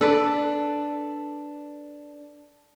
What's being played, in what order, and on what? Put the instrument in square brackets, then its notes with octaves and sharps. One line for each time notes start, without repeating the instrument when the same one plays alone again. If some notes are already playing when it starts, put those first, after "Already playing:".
[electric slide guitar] D4 [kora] A4 B4 D5